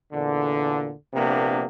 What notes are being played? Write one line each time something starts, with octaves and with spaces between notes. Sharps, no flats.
E2 A#2 D3
A#1 C3 A#3 B3 D4